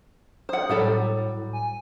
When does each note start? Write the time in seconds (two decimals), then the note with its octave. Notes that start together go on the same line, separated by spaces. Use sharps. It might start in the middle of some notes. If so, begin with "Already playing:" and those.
0.49 C5 F#5 D#6
0.69 A2 F#3 G3 A4
1.53 G#5